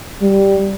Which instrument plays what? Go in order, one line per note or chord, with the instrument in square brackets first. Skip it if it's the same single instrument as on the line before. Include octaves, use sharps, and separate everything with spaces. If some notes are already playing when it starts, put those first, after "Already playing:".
[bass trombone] G3